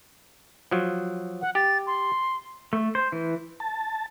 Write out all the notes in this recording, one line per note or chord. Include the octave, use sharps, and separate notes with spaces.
F3 F#3
F#5
G4 A6
C6
A3
C5
E3
A5